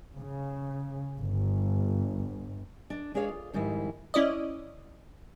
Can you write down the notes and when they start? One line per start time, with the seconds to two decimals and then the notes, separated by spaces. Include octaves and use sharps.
0.16 C#3
1.18 G1
2.90 D4
3.14 G#3 D4 G#4 C#5 F5
3.29 F4
3.54 F2 G#2 D#3 G3 E4
4.14 C#4 E4 D5 D#5